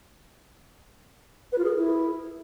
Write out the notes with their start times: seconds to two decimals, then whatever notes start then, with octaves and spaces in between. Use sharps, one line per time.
1.52 B4
1.58 F4
1.64 G#4
1.70 A#4
1.76 E4